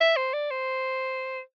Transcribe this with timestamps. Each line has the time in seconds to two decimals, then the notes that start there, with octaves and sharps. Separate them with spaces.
0.01 E5
0.17 C5
0.34 D5
0.51 C5